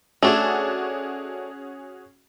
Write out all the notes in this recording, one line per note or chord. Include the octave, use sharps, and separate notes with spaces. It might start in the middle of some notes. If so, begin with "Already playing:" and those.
A3 C#4 D4 F#4 G#4